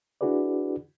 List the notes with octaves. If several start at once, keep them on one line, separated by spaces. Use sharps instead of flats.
D4 E4 F#4 G#4 B4 D5